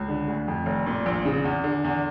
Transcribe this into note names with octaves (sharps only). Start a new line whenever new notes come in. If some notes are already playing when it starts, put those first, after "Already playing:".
Already playing: C#2
D3
D2
F2
F1
A#2
A#1
C#3
E2
D3
E2